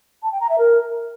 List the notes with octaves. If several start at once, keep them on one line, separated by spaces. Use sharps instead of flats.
A5
G5
A#5
E5
A#4